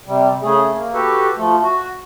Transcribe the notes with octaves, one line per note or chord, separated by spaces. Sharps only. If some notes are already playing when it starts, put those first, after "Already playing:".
C3 G3
C#3 A3 G#4
A#3
F#4 G4 A4 B4
F3 A3
F#4